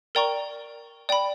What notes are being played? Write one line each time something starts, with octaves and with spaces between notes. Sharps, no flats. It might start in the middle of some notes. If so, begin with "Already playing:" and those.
A#4 D5 G5 A#5 C#6
D5 G5 B5